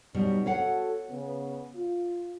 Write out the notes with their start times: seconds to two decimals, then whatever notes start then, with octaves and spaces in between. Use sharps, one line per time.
0.14 B2 G3 B3 C#4 D#4
0.46 F#4 A4 C#5 F5 F#5
1.10 C#3 B3
1.75 F4